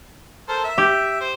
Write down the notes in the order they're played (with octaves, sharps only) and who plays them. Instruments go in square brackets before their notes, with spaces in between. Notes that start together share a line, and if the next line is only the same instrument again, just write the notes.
[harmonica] A4 A#4 C5
E5
[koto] G4
[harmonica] C5